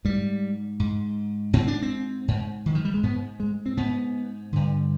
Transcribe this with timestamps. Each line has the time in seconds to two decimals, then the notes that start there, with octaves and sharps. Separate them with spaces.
0.05 G#2 G3
0.80 G#2
1.53 G#2 C4
1.67 D4
1.82 C4
2.28 G#2
2.66 D#3
2.75 F3
2.85 G3
2.94 G#3
3.03 G#2 B3
3.40 G#3
3.66 C4
3.77 G#2 B3
4.53 G2 D3